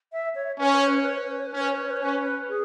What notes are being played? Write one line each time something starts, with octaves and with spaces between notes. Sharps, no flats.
E5
C#5
C#4 B4
C#5
B4
C#5
B4
C#5
B4
C#5
B4
C#5
B4
C#5
B4
C#4 C#5
B4
C#5
B4
C#5
B4
C#5
C#4 B4
G#4